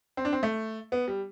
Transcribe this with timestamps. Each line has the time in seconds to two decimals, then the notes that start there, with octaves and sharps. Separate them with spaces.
0.17 C4
0.25 D4
0.33 C4
0.43 A3
0.92 B3
1.08 G3